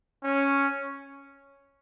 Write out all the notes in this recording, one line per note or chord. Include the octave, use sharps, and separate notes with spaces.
C#4